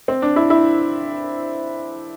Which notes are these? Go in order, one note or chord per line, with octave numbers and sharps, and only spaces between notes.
C4
D4
E4
E4